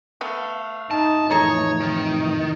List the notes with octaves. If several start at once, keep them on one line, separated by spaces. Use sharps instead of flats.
A3 B3 F5
D#4 A5
F2 A2 E3 D#4 G#4 A4 C#5 A#5
C3 D#3